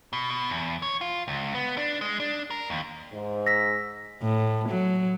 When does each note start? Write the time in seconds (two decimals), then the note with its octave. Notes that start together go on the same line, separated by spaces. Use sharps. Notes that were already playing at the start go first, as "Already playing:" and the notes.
0.13 B2
0.30 B2
0.50 E2
0.82 C#5
1.01 F4
1.28 C#2
1.55 B3
1.77 D4
2.01 G#3
2.20 D4
2.51 A#4
2.70 D#2
3.12 G#2
3.47 E6 A#6 B6
4.22 A2
4.68 F#3